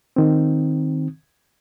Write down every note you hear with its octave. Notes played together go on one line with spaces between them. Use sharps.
D#3 C4